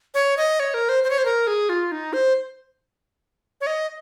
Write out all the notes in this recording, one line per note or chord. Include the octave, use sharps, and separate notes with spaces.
C#5
D#5
C#5
A#4
C5
C5
C#5
C5
A#4
G#4
F4
D#4
C5
C#5
D#5